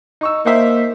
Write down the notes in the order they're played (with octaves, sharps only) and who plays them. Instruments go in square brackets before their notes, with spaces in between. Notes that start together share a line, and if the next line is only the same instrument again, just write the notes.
[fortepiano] D#4 C#6 E6
[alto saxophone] A#3 [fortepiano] D#4 C5 E5